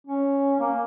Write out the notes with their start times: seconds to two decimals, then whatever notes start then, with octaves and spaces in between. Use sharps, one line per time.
0.07 C#4
0.60 A#3